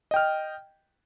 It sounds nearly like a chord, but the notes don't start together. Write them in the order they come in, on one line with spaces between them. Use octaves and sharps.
D#5 G5 F6